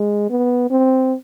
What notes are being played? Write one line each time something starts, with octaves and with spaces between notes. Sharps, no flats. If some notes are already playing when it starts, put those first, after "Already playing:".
Already playing: G#3
B3
C4